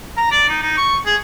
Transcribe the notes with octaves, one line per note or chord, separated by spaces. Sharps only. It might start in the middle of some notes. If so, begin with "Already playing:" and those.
A#5
D5
D#4
D#4
C#6
G#4